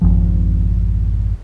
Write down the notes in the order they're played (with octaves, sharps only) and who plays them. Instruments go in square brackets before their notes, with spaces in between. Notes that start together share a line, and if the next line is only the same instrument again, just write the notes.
[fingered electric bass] G#1 F2 F3